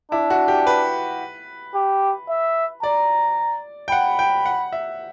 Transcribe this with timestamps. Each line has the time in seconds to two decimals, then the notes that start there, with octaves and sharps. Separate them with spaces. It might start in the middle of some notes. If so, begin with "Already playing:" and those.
0.12 D4 E4
0.30 F#4
0.48 G4
0.67 B4
1.75 G4
2.29 E5
2.83 D5 A#5
3.88 G5
3.92 F#5 B5
4.19 G5
4.46 F#5
4.72 E5